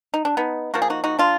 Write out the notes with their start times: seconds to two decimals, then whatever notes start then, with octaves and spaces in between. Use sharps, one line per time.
0.14 D#4
0.25 D4
0.37 B3 D#4
0.74 F3 A#3 F#4
0.82 G#4
0.90 D#4 F#4
1.04 D#4 F#4
1.19 D4 F4